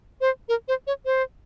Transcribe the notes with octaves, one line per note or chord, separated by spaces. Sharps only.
C5
A#4
C5
C#5
C5